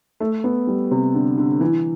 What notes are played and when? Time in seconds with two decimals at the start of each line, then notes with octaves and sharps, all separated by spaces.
0.20 A3
0.44 B3
0.67 G3
0.91 C3
1.14 D3
1.38 D3
1.61 E3